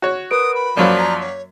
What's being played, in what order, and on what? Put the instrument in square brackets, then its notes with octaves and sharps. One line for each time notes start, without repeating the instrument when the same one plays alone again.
[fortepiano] F#4 C#5
[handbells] A#4 B4 D7 [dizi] D#6
[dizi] B5
[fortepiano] F#2 F#3 A#3 [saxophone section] F3 [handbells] D5
[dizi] A#5 [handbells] B6
[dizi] C#5